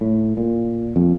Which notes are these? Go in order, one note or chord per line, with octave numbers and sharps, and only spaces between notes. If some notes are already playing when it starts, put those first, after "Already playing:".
A2
A#2
F2